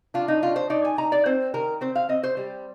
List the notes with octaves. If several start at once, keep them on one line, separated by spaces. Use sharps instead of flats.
D4 F4
D#4
D4 F4
C5
D#4 D5
G#5
D#4 A#5
D5
C4 C5
D#3 A#4
C4 C5
F5
C4 D#5
C5
G3